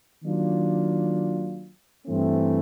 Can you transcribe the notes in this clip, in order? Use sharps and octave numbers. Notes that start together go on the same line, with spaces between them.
D#3 F#3 A#3 D4 F4
G2 E3 A3 C4